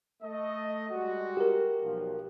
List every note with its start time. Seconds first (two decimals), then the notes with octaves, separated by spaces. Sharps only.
0.22 A3 D#5
0.90 G3 G#3 F#4
1.37 G4 A#4
1.82 B1 F3